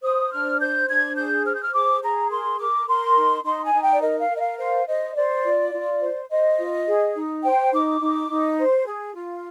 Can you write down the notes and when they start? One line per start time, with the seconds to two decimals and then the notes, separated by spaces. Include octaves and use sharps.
0.02 C5 D#6
0.31 D4 F6
0.60 C5 G6
0.88 D4 G#6
1.16 G#4 G6
1.45 C5 F6
1.54 G6
1.62 F6
1.73 G#4 D6
2.02 G#4 A#5
2.30 A#4 C6
2.59 A#4 D6
2.88 A#4 C6
3.16 D#4
3.44 D#4 C6
3.64 G#5
3.73 D#4
3.83 G5
3.93 D5
4.01 A#4 D#5
4.20 F5
4.30 A#4
4.35 D#5
4.39 F5
4.58 C5 F5
4.87 C5 D#5
5.15 C5 D5
5.43 F4
5.73 F4
6.00 C5
6.29 C5 D#5
6.58 F4
6.86 G#4
7.15 D#4
7.44 C5 G5
7.72 D#4 D6
8.01 D#4
8.29 D#4
8.58 C5
8.86 G#4
9.14 F4